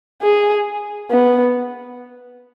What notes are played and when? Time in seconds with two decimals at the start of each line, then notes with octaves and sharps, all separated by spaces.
0.22 G#4
1.11 B3